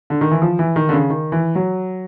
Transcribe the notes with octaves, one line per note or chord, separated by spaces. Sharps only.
D3
D#3
E3
F3
E3
D#3
D3
C#3
D#3
E3
F#3